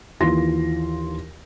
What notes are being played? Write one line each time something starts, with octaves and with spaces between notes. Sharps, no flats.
D#2 E3 F4 C6 A#6